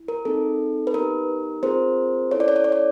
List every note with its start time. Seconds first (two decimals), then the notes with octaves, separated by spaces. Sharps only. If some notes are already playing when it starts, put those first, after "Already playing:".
Already playing: E4
0.08 A#4
0.25 C4 D#4 G#4 A4
0.87 B4
0.94 B3 D#4 G4 A#4
1.63 C4 F4 G#4 A#4 C5
2.31 C#4 E4 A4 C#5
2.40 D5
2.48 C#5
2.56 D5
2.64 C#5
2.72 D5